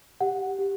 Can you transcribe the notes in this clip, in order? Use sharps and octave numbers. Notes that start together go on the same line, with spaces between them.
G4 F#5
G4